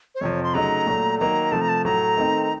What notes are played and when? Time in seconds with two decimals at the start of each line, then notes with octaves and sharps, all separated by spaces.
0.15 C5
0.21 F2 C3 F3 C#5
0.43 C6
0.54 C#3 F#3 A3 D#4 A#5
0.87 A#2 F#3 A3
1.19 D#3 F#3 A#3 D#4 A#5
1.52 C3 F3 A3 A5
1.61 A#5
1.69 A5
1.84 A2 F#3 A3 A#5
2.17 D#3 A3 C4 D#4